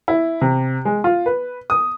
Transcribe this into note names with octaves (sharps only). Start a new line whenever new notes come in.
E4
C3
G#3
F4
B4
D#6